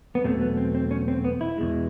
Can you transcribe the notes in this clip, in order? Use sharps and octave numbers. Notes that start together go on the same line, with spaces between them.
B3
E2 B2 F#3 A3 C4
B3
C4
C4
C#4
C4
B3
E4
E2 B2 G#3